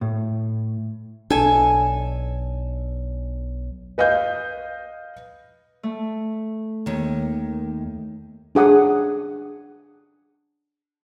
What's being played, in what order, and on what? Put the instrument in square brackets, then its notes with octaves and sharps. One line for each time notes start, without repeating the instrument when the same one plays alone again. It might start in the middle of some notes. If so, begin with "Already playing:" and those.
[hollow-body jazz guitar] A2
[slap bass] B1 D4 [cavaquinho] A4 G#5
[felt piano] B4 D#5 F5 G6
[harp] A3
[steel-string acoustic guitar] D#2 D#3
[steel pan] D4 G#4 F#5 D#6